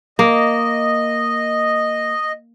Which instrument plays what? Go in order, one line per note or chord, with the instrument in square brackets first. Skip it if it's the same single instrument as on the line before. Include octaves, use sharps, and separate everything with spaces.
[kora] A#3 [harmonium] D#5